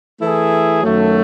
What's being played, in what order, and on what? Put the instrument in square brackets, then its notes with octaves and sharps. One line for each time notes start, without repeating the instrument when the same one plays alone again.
[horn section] E3 A3 E4 G#4
F#2 D#3 F#3 A3